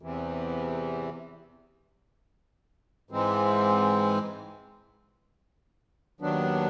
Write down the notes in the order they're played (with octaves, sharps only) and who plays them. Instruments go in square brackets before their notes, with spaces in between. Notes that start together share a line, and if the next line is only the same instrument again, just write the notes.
[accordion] E2 C3 E3
G#2 E3 G#3 C4
D#2 D#3 F#3 B3 D4